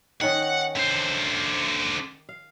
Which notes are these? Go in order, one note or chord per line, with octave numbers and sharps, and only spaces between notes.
D#3 C#4 D#5 F#5
D3 C5
F5